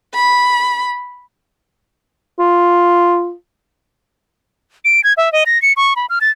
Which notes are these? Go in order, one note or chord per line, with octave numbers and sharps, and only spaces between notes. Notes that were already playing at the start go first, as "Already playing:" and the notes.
B5
F4
D7
G#6
E5
D#5
A#6
C#7
C#6
B5
F6
A6